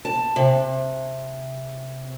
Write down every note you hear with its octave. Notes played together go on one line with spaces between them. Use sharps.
A5
C3